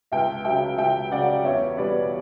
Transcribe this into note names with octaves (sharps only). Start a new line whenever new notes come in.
C#2 E5 G5
C#3 F#3 E5 G5
C#2 E5 G5
C#3 F#3 D5 F#5
E2 C#5 E5
B2 G3 B4 D5